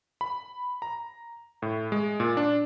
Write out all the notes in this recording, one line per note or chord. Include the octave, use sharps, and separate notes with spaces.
B5
A#5
A2
G#3
A#2
D4